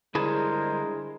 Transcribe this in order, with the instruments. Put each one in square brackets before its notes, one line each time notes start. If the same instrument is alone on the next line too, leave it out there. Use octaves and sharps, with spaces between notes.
[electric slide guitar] D3 G3 [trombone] G#3 [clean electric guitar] E4 G#4 A5 [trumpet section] A#4 C5